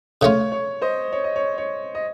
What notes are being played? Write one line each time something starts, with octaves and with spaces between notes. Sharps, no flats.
C#3 A3 C#4 F4 C#5
C#5
C5 D#5
C#5
D#5
C#5
C#5
D#5